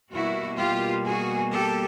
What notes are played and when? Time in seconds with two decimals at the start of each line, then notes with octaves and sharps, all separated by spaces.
0.12 B2 G3 A#3 E4 F#4
0.58 F4 G4
1.06 F#4 G#4
1.53 G4 A4